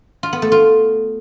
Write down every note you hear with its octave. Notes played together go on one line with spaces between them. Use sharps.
F4
B3
A3
F4